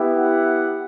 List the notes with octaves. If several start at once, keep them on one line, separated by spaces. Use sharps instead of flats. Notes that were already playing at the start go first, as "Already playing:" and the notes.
Already playing: B3 E4 G4
F#5